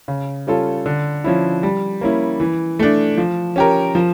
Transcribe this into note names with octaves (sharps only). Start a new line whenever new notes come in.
C#3
G3 C#4 F4 A4
D3
F3 C#4 E4
G3
A#3 C#4 E4
E3
A3 D4
F3
C#4 G4 A#4
F3